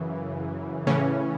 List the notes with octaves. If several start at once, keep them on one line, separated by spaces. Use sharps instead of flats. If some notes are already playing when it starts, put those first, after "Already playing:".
Already playing: F#2 C#3 E3
A2 C#3 E3 C#4